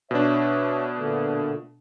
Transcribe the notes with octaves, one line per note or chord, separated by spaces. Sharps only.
B2 D4 C#5 E5
A#2 D3 A3